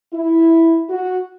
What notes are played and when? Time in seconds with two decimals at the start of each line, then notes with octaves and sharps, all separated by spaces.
0.14 E4
0.90 F#4